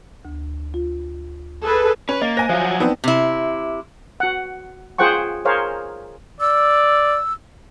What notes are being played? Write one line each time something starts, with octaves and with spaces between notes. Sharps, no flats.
D2
F4
G#4 A4 B4
C#4 B4
A#3 D#5
C5 G#5 A#6
F3 F#3 C5 E5 F5
F#5
B3 C4 D4 D#4
C3 E4
F#4 F#5
F4 G#4 C5 F#5 G5 C#6
G#4 A#4 C5 C#5 F5
D5 E6